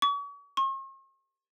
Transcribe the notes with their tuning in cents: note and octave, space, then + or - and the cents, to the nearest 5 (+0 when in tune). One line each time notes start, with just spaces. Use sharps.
C#6 +40
C#6 -45